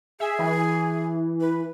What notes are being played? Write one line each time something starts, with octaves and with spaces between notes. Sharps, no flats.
G#4 E5
E3
B4